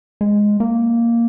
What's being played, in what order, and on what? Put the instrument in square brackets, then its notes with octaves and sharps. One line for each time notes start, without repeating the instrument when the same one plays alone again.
[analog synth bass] G#3
A#3